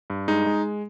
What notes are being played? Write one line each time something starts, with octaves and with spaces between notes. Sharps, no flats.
G2
G#3 D#4
G#3